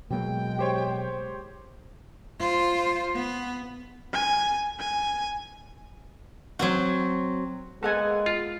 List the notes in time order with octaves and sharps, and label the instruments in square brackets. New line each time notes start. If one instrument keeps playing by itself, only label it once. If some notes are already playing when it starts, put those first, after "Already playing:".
[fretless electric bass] B2 F#3 A#3 [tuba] G#3 [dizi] G5
[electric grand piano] G4 C5 C#5
[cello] F4 C5
B3
[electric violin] G#5
G#5
[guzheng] F#3 C4 F#4
[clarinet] G#3 [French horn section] A#3 B3 G#4 [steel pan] A4 F#5 G#5
[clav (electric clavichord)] F4